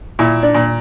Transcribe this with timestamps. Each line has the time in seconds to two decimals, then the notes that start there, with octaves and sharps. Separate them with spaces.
0.19 A#2 E4
0.43 D4
0.54 A#2